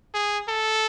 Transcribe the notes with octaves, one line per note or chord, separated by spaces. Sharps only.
G#4
A4